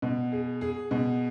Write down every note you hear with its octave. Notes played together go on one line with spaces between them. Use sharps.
B2
G#4
G#4
B2